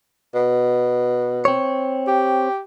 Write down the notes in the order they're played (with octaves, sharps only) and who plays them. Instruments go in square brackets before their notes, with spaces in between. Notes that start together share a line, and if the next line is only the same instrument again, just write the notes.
[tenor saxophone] B2
[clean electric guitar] C4 C#5
[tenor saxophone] G4